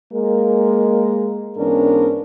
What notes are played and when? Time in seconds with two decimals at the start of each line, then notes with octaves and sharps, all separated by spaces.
0.12 G#3 A#3 A#4
1.56 G#2 E3 B3 C#4 D4 A#4